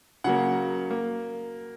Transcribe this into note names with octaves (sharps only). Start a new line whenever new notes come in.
C#3 F#3 A#3 F#5
A#3